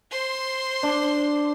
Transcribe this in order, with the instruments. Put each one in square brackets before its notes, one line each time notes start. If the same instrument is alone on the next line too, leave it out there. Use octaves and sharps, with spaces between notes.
[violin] C5 C6
[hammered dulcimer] D4